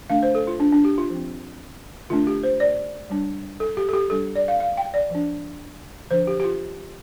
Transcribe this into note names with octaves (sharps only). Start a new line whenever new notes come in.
D3 A3 D4 F5
C5
A4
F4
D4
D4
G4
F4
F3 C4
D3 A3 D4 F4
G4
C5
D5
G3 D4
A4
G4
A4
G4
G3 D4 A4
D5
F5
F5
G5
D5
F3 D4
D3 F3 D4 C5
G4
G4
F4